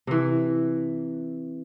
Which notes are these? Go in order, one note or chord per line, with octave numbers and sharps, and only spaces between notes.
C3 E3